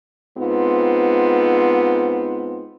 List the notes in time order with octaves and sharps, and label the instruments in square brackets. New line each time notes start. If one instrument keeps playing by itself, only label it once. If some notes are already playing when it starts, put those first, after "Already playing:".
[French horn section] G#2 B3 C4 F4